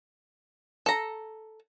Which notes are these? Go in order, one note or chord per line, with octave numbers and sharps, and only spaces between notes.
A4 A#5